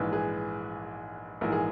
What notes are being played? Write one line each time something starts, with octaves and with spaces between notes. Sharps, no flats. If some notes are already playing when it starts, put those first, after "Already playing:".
Already playing: A#1 G#2 E3 B4
G#4 B4
A#1 G#2 E3 A#4
G#4